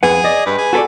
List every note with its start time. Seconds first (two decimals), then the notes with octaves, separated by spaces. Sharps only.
0.03 F2 G#4 B4 F#5
0.24 D5 D#5
0.46 G2 B4
0.58 G#4
0.73 F#4 A4 B4 D5